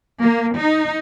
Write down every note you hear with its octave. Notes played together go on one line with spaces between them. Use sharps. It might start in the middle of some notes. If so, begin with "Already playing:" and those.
A#3
D#4